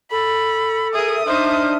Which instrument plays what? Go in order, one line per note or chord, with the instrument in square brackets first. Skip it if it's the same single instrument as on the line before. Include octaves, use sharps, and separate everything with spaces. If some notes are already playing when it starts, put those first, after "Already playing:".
[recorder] A4 [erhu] B5
[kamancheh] G#4 A#4 [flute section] E5 [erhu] D#6
[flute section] D4 E5 F6 [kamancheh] D#4 C5